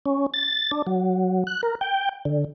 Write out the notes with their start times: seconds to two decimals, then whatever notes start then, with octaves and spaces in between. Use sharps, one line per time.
0.06 C#4
0.34 A6
0.71 D4
0.87 F#3
1.47 F#6
1.63 A#4
1.81 G5
2.25 D3